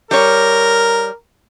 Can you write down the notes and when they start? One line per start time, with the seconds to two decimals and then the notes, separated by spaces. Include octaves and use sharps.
0.11 G3 A#4 C#5